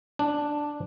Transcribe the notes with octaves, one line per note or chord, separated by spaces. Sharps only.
D4